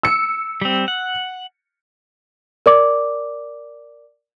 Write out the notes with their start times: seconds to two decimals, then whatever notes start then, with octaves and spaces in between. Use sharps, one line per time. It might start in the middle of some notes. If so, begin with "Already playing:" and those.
0.03 E6 C#7
0.62 G3 C4
0.88 F#5
2.66 A#4 D5 D6